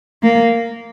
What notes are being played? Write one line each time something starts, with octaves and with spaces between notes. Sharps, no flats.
A#3